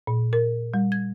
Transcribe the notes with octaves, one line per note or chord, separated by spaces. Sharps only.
A#2
A#4
G3
G#6